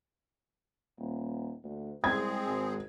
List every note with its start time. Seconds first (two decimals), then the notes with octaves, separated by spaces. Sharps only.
0.98 D#1
1.64 D2
2.04 C2 G#3 C4 G#4 G#6
2.45 G#1